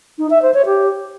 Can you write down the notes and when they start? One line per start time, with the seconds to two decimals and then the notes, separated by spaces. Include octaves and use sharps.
0.18 D#4
0.30 E5
0.42 C5
0.54 C#5
0.66 G4